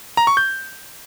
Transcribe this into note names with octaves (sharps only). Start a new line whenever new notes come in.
A#5
C#6
G6